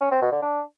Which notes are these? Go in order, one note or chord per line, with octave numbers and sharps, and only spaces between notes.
C#4
C4
B2
D3
D4